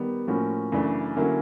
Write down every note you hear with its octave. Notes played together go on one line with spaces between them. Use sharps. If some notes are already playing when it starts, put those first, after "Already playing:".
Already playing: D#3 G3 B3
A2 F3 A#3 C#4 F#4
F#2 C#3 E3 A3 D4
D3 F#3 A#3 C#4 E4